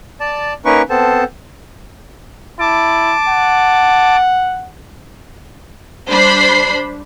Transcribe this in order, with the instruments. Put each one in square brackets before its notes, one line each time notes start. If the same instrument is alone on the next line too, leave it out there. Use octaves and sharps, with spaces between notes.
[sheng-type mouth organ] D5 A5
A#3 C#4 D#4 A#4 B4 C#6
B3 C4 A4 C5 A5
[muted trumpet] E4 [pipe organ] A5 D6
[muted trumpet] F#5
[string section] G3 D4 C5 B5 C7